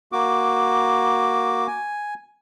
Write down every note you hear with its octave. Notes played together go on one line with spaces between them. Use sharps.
A#3 F#4 D6
G#5